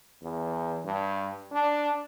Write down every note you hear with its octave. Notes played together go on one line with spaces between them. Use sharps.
E2
G2
D4